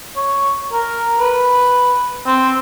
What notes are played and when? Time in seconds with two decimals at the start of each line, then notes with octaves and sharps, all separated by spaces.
0.16 C#5
0.72 A#4
1.20 B4
2.27 C4